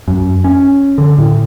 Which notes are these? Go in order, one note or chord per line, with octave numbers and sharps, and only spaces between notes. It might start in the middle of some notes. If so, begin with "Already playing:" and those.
F#2
C#4
D3
A2